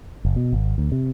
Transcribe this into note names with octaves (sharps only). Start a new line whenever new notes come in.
F#1
B2
G#1
D2
C3